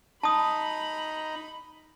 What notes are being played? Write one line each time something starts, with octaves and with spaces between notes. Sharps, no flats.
D#4 A5 B5 D#6